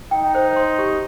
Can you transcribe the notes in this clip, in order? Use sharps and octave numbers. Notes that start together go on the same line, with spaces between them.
D#4 G5
C5
C6
G4